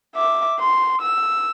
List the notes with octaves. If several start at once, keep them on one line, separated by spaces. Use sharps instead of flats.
E5 D6
C6
E6